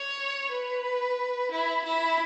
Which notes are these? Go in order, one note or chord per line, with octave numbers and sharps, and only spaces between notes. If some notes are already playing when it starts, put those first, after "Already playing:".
Already playing: C#5
B4
E4
E4